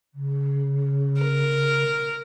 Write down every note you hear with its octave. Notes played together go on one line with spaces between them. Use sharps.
C#3
A#4